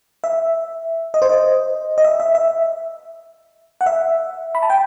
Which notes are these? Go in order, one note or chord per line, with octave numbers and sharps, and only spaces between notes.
E5
D#5
C5
D#5
D#5
E5
E5
E5
F#5
E5
B5
A5
G5